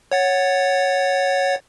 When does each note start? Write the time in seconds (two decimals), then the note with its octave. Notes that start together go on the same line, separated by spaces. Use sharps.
0.12 C#5 F#5 A6